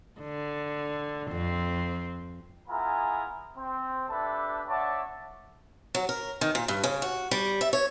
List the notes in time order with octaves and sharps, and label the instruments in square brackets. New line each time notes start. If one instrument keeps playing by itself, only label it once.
[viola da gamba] D3
F2 C4
[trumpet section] B3 E4 F4 G#4 G#5 A#5
C4
D4 G4 A4 B4 E5 A5
D4 C#5 D5 E5 F#5 A5
[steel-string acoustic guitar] F#3
A#4
D#3
A#2
G2
C#3
F#4
G3
E5
C#5